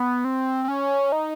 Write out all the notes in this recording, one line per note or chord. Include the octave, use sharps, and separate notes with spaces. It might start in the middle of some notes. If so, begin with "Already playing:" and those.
Already playing: B3
C4
C4
C#4
D#4